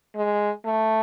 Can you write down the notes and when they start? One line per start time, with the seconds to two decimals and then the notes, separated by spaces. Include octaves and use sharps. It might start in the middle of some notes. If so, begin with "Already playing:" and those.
0.16 G#3
0.66 A3